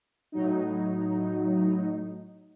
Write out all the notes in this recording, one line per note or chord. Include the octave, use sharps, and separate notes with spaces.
A2 F#3 D#4